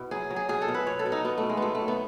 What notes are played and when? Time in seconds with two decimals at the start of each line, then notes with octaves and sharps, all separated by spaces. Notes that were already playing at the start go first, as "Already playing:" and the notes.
Already playing: B2 B3 E4
0.11 F#3 G#4
0.30 F#3
0.36 G#4
0.49 B2 G#4
0.62 A4
0.68 B2
0.74 B4
0.87 B2 C#5
0.99 A4
1.06 B2
1.12 D#4
1.25 B2 B3
1.38 A3
1.43 B2
1.49 G#3
1.57 B3
1.62 B2 A3
1.75 A3
1.81 F#3
1.88 B3